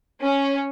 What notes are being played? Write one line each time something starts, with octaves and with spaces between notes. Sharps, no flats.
C#4